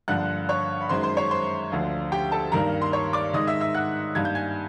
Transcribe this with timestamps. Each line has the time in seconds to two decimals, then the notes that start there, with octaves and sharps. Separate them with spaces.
0.08 G2 D3 F3 A#3 F#5 F#6
0.49 C#5 C#6
0.81 B5
0.89 F#2 D#3 G#3 C5 C6
1.03 C5 C6
1.17 C#5 C#6
1.31 C5 C6
1.72 D2 D3 F3
2.12 G4 G5
2.32 A4 A5
2.52 G2 D#3 G3 A#3 A#4 A#5
2.82 C6
2.93 C#5 C#6
3.13 D5 D6
3.33 G#2 D#3 G#3 D#5 D#6
3.47 E5 E6
3.60 E5 E6
3.75 F#5 F#6
4.15 G2 D#3 G3 A#3 G#6
4.25 G6
4.35 G#5 G#6